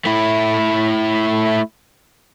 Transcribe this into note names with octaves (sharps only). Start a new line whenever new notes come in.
A3 E4